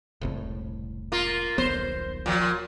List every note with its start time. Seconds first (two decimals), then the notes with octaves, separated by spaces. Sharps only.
0.22 E1 C2 A2
1.12 A#3 F4
1.58 D#1 B1 B3 C5
2.26 A#2 F3